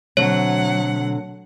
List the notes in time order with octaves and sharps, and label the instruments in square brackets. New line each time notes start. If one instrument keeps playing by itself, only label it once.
[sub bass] B2 [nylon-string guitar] D3 A3 C4 [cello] F#3 F#5 [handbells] C#5